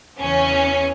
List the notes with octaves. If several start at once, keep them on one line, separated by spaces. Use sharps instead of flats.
E2 C#3 E3 C#4